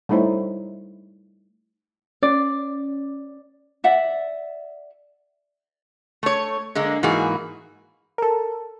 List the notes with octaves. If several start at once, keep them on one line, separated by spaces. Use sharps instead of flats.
G3 A3 D#4 E4 C5 C#5
C#4 D5
D5 E5 F#5
A3 C#5
D3 G#3 A#3
G#2 E3 A#3 F#4 G#4
A4 A#4